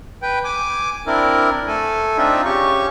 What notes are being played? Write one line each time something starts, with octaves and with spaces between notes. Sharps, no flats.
B4 G5
G#5 D6
C4 D4 E4 A#4
A3 A4 G#5
C4 D4 D#4 F4 E5
C#3 C#4 G4 C#6